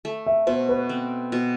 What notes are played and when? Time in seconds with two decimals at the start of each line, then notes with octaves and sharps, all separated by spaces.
0.05 A3
0.26 E5
0.47 B2 C5
0.69 B4
0.89 C4
1.32 B2